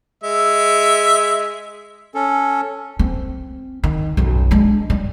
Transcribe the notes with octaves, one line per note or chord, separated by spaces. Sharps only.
G#3 E5
C#4 A4
C4
D#3
B1 F#2
G#3 D4
G3